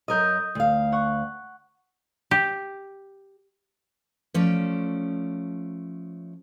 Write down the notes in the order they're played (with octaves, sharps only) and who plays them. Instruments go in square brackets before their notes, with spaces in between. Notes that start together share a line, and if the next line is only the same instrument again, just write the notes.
[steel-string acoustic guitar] F#2 A#4 D#5 [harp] D#6 G6
[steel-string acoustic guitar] D2 F5
[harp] F#5 C#6
[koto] G4
[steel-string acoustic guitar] F3 A3 C#4 D5